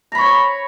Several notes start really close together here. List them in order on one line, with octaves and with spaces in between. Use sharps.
A#5 B5 C#6 C#5